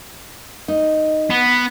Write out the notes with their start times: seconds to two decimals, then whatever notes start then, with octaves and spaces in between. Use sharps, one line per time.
0.68 D#4
1.30 B3